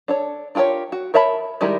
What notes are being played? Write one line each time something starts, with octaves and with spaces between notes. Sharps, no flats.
D4 A4 C#5
D4 F4 G4 A#4 C#5
F#4
A#4 C#5 E5 A5 B5
D#3 G3 G#3 E4 A#4